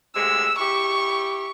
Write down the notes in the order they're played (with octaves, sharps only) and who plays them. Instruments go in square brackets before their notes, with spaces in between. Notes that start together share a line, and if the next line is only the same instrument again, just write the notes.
[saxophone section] D2 C3 G#3 [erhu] E6
[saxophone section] E4 G4 [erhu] C#6